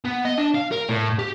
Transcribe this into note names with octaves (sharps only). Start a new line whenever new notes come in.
B3
D#5
D4
F5
A#4
A2
G4